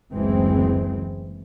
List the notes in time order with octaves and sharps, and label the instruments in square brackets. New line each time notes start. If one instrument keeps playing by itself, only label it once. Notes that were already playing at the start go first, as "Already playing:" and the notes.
[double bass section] F#1 D2 E3 G#3 C4